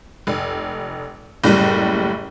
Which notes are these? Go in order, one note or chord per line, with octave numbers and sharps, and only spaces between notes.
F1
F#1 A2 G3